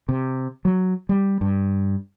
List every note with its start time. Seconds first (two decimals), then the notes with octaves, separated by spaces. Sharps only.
0.09 C3
0.65 F#3
1.09 G3
1.41 G2